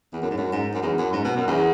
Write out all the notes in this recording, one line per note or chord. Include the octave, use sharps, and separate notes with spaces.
E2
F#2
G#2
F#2
G#2
F#2
E2
F#2
G#2
B2
F#2
E2